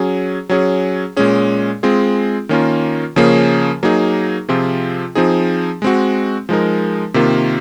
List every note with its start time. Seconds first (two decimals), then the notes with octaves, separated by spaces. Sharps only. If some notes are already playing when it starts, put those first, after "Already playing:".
Already playing: F#3 C#4 G#4
0.49 F#3 C#4 G#4
1.17 A#2 G#3 C#4 G#4
1.83 G#3 C4 F4 G#4
2.49 D#3 A#3 C#4 F4 A#4
3.16 C#3 F3 A#3 C#4 G#4
3.83 F#3 A#3 D#4 G#4
4.49 C3 F3 C4 F4 G#4
5.15 F3 C4 D#4 G#4
5.82 G#3 C4 F#4
6.49 F3 G#3 D#4 A#4
7.14 C3 D#3 A#3 F4